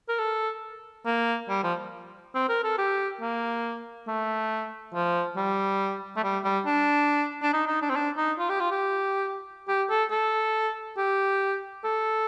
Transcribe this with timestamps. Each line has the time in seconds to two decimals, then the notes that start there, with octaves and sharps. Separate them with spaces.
0.09 A#4
0.19 A4
1.05 A#3
1.49 G3
1.63 F3
2.35 C4
2.49 A#4
2.64 A4
2.78 G4
3.21 A#3
4.08 A3
4.94 F3
5.36 G3
6.17 A3
6.24 G3
6.44 G3
6.66 D4
7.42 D4
7.53 D#4
7.67 D#4
7.82 D4
7.90 C4
7.96 D4
8.17 D#4
8.39 F4
8.49 G4
8.60 F4
8.71 G4
9.68 G4
9.90 A4
10.11 A4
10.98 G4
11.84 A4